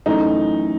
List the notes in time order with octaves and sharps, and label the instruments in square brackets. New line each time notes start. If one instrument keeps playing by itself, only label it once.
[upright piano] F#2 E3 A3 D#4